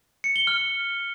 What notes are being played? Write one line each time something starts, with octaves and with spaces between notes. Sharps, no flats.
C#7
G7
F6